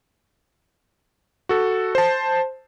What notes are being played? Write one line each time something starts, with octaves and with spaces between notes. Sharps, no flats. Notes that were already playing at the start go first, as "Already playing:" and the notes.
F#4 A4
C5 A5